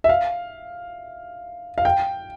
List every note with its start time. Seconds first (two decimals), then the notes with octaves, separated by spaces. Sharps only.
0.04 E5
0.09 F5
1.78 F5
1.85 G5